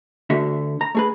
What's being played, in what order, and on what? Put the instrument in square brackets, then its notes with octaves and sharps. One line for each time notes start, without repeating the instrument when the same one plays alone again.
[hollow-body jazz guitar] D2 D3 F#4 E5
A#5
A3 G#4 B4